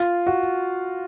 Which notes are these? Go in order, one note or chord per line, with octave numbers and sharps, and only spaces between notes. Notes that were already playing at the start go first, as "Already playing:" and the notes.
Already playing: F4
F#4